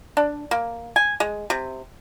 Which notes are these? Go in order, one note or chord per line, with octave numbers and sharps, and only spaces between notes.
D4
A#3
G#5
G#3
C3